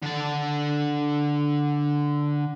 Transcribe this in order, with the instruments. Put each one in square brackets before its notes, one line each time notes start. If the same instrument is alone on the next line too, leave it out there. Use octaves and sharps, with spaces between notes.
[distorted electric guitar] D3 A5